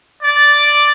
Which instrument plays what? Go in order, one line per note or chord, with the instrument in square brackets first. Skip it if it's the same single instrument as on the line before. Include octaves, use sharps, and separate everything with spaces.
[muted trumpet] D5